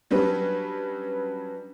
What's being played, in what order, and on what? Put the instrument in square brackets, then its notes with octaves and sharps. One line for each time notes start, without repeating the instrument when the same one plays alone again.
[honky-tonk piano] F#3 G3 C#4 D4 B4